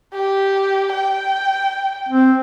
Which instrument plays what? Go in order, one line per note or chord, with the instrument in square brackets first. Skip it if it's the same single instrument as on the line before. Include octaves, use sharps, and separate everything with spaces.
[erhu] G4
G5
[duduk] C4